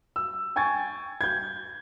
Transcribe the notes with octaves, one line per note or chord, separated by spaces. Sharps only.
E6
G5 G#5 C#6 G#6 A6
G6 G#6